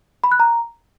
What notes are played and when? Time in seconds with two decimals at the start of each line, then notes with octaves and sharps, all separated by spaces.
0.24 B5
0.32 F#6
0.40 A#5